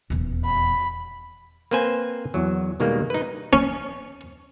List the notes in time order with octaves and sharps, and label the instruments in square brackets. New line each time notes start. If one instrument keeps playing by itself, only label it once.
[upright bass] D#1 E2
[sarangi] B5
[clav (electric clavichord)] A#3 C4 B4 C5 G#5
E2 F#3
B2 D#3 G3 G#3 A#3
D#4 B4
[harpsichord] C#4